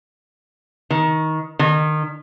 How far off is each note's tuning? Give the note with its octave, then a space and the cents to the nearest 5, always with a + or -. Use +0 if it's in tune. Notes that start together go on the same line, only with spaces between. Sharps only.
D#3 +20
D#3 -25